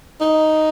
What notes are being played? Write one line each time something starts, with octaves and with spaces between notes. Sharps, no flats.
D#4